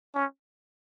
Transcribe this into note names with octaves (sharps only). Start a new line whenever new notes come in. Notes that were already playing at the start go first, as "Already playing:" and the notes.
C#4